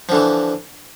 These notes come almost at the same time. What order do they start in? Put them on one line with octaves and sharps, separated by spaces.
F3 D3 E3